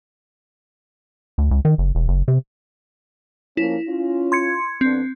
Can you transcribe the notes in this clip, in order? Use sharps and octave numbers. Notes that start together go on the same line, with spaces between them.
D2
C#2
D#3
F#1
E1
F#1
C3
F3 A#3 C#4 E4
C#4 F4
C6 G#6 C#7
F2 B3 C4 D4